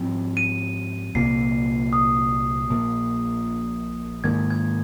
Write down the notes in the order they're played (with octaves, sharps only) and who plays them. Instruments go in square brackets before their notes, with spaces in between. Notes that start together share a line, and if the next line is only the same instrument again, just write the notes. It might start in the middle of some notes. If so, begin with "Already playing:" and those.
Already playing: [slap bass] G#2 F3 C4
[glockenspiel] D#7
[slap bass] C2 A#2 A#3 [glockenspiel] C7
[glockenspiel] D#6
[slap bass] A#1 A#2 A#3
[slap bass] G#2 D#3 A#3 [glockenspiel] G#6
[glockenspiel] G#6